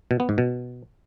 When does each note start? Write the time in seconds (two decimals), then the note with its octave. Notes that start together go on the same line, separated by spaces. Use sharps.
0.11 B2
0.20 B3
0.29 G#2
0.38 B2